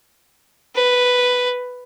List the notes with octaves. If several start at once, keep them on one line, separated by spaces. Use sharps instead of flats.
B4